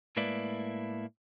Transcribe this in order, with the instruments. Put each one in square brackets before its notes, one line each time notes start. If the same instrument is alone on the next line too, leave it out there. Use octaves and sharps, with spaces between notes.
[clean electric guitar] A2 G#3 A#3 E4 B4 D5